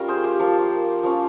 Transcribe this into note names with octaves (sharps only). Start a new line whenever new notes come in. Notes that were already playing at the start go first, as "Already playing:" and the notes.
Already playing: G3 A#3 C#4 F4 A#4
G#4 C5
G4
F3 A#3 F4
F3 A#3 C#4